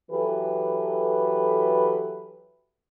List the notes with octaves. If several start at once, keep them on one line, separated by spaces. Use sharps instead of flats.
E3 F#3 G4 A4 B4